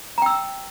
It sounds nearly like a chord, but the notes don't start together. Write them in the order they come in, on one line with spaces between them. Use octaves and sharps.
A#5 G5 E6